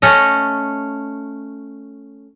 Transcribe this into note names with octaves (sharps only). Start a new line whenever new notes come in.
A3 C#4 A4 D#5